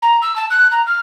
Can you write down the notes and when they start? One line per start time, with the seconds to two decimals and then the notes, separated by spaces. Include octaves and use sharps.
0.02 A#5
0.22 E6
0.36 A5
0.50 F#6
0.71 A#5
0.86 F6